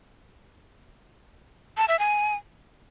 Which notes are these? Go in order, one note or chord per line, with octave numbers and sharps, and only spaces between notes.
A5
E5
G#5